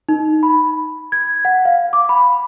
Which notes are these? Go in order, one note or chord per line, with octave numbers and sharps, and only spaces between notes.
D#4
B5
G#6
F#5
F5
D6
B5